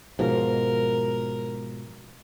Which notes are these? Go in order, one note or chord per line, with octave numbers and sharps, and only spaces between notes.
G#2 B2 F3 A#4